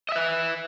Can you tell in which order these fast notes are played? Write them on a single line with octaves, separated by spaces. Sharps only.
D#5 E5 B4